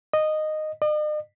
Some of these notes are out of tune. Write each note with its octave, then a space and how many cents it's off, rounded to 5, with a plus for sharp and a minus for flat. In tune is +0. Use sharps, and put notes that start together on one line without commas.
D#5 -10
D#5 -45